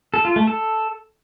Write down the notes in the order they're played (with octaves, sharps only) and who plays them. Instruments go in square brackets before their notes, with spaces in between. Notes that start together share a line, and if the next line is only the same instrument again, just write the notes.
[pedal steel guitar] A4
F4
A3
A4